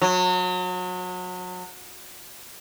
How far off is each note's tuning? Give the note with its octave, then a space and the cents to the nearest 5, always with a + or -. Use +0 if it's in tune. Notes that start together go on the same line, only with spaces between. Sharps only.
F#3 -30